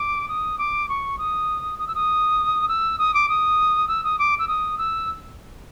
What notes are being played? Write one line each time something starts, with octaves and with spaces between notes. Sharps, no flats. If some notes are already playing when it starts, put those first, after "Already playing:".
Already playing: D6
D#6
D6
C#6
D#6
D#6
E6
D#6
E6
D#6
D6
D#6
E6
D#6
D6
E6
D#6
E6